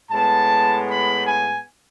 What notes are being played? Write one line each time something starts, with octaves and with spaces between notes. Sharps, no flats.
A2 G#3 B3 A5
B5
G#5